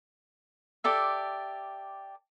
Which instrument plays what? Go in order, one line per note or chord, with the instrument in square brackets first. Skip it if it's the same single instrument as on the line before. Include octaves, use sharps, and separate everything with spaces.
[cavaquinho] G4 A4 D5 E5